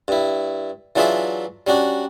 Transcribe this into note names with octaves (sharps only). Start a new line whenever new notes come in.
G2 E4
E3 F#3 D4 F4 G#4 E5
G3 C#4 D4 F#4